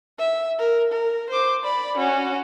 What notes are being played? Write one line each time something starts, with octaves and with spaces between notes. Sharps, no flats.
E5
A#4
A#4
C5 D6
D5 B5
C#4 F#4